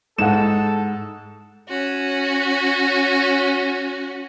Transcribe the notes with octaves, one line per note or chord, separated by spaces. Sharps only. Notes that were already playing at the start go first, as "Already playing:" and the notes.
G#2 A4 F#5 E7
C#4 F#4